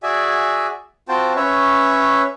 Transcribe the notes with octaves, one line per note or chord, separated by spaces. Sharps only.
F#4 G#4 D5 E5 G#5
C4 F4 F#4 C5 G5 A5
C#4 B4 C#5 E5